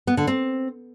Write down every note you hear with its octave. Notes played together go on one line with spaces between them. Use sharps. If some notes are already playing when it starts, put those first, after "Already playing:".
B3
D3
C4